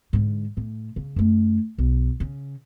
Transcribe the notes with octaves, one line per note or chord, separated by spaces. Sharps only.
G#2 D3
A2
C#3
F#2 A3
B1
C#3